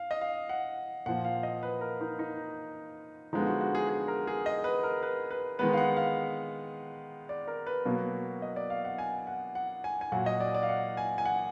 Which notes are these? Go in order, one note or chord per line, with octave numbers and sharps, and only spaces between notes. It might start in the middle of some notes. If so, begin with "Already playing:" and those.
Already playing: F5
D#5
F5
F#5
A#2 F3 A#3 F#5
F5
D#5
B4
A#4
D#4
D#4
D3 F3 G#3 B3 D#4
F#4
F#4
G#4
G#4
A#4
G#4
D#5
B4
A#4
B4
B4
D#3 G#3 B3 B4
F5
F#5
F5
D5
A#4
B4
B2 F#3 A#3
D#5
D5
F5
F#5
G#5
F#5
F#5
G#5
G#5
A#2 F#3 A#3 F#5
D#5
D5
D5
F5
F#5
G#5
G#5
F#5